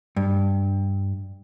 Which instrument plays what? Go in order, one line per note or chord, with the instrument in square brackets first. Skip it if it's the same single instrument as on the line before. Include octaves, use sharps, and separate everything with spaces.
[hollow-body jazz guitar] G2